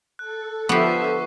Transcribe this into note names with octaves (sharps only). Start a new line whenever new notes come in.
A4 F#6
D3 F3 B3 G4 E5 C#6 C7